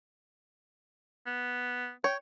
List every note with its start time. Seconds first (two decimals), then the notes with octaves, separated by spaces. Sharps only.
1.27 B3
2.04 C#5 G5